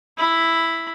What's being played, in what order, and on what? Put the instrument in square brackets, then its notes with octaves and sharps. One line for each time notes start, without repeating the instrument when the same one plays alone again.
[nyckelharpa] E4 B5